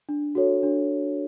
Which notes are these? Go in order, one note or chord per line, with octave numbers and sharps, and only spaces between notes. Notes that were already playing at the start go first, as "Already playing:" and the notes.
D4
F#4 A4 C#5
D4